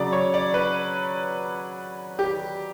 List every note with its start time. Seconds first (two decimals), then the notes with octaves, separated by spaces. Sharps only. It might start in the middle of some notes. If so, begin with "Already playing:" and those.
Already playing: C#3 F#3 D5
0.12 C#5
0.34 D5
0.54 B4
2.19 G4